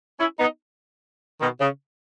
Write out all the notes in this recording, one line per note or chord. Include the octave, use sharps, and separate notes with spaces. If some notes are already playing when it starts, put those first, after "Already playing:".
C#4 E4
B3 D#4
B2 D#3
C#3